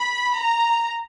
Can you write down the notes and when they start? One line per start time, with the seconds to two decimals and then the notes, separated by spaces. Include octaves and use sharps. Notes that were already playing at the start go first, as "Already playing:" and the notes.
Already playing: B5
0.39 A#5